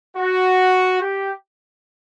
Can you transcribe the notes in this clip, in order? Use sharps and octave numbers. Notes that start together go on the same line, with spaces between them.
F#4
G4